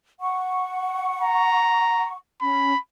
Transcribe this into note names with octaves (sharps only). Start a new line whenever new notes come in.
F#5 C#6
A#5
C#4 B5